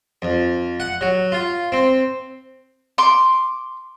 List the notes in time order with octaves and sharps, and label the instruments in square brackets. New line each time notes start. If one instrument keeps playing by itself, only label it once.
[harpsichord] F2
F#5
F#3
F4
C4
[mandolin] C6 D6